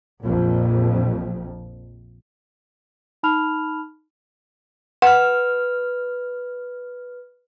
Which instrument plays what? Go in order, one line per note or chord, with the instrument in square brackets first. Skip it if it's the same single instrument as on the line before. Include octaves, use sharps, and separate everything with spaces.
[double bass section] A#1 F2
[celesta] D#4 A5 B5 F6 F7
[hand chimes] B4 F6 [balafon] F#5